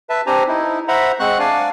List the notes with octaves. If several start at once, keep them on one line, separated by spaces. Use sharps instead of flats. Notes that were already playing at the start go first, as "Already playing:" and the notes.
B4 E5 A5
C4 D4 G4 C5 G#5 A#5
D#4 E4
C5 E5 F#5 A#5 B5
G#3 C4 C5 F#5 C#6 F#6
D4 D5 F5 G#5